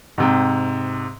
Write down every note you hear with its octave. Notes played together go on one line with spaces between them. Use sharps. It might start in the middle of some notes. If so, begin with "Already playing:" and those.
G#2 C3 G5